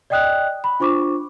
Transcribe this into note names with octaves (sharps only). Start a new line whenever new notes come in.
D5 D#5 G5 D#6 F#6
B5
D4 F4 C5 C#6 D6